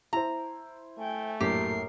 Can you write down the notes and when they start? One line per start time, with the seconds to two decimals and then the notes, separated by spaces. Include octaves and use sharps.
0.13 E4 C5 A#5
0.98 A3 G5 G#5
1.40 A#1 F#2 A2 G4 A#4 C7